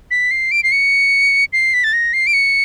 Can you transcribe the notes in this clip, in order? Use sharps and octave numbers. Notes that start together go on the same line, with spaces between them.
B6
C7
D7
C7
C#7
C7
B6
A6
A#6
C7
D7
C#7